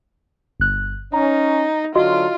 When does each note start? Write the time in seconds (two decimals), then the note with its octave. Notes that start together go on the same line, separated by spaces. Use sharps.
0.60 G1 F#6
1.13 C#4 D#4 A#5
1.95 D3 F#3 F4 F#4 D#5 C6